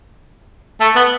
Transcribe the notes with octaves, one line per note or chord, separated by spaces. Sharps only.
A3
B3